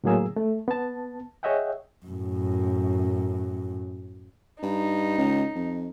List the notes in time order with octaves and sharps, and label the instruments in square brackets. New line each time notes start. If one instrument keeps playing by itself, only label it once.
[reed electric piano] A2 D3 F#3 A#3 G#4 E6
A3
B3 A5
G#4 C#5 D#5 E5 F#5 G5
[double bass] F#2 A2
[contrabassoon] G2 [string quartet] D#4
[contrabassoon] C#2
F2